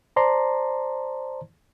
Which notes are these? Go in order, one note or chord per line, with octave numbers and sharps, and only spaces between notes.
C5 D5 A5 A#5 C6